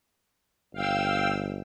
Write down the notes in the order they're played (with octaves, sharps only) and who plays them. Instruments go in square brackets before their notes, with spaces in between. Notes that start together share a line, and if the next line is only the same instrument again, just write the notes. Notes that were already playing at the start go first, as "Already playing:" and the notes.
[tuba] G1 [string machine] F5 G5 E6